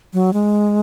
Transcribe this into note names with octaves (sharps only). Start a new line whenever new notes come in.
F#3
G#3